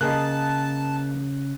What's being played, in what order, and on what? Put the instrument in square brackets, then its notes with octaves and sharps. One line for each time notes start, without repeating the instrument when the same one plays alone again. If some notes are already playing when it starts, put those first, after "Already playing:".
[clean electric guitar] C#3 [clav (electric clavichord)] A#3 G#4 D#5 [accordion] A5 [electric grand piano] F#6